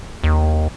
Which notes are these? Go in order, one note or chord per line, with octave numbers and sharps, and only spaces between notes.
D#2